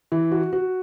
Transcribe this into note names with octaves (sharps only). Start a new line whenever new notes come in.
E3
F#4
F#4